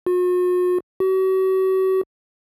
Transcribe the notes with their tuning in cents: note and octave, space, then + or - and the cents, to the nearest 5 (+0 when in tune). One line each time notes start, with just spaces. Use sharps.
F#4 -45
F#4 +40